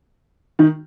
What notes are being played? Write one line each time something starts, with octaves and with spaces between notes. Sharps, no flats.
D#3 D#4